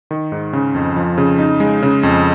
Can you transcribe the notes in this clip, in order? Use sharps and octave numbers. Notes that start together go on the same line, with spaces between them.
D#3
G#2
C#3
F2
F3
C#3
D#4
G#3
C#3
F2